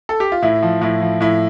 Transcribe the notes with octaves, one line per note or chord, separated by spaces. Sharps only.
A4
G4
F4
A2 E4
F3
A2 E4
F3
A2 E4